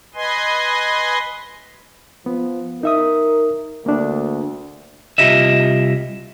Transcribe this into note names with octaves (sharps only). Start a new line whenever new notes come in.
B4 D#5 G#5 C6
F3 B3
D#4 A#4 E5 D#6
D2 A#3 D4
C2 C#3 F4 G4 D#5 E5